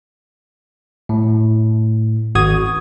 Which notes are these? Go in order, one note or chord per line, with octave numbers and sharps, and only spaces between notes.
A2
G#1 F#4 D#6 G#6